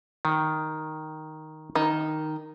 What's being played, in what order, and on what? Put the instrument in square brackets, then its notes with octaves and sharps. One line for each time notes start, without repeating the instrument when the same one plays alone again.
[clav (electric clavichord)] D#3
[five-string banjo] D#3